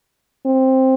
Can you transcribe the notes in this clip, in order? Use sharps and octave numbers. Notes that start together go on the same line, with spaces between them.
C4